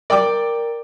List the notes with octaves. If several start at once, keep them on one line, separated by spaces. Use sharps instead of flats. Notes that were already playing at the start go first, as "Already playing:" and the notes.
A#4 D5 G5 D6